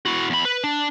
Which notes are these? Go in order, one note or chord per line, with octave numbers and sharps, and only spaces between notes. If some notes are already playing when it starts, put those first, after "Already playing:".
E4 F#4
E2 B5
B4
D4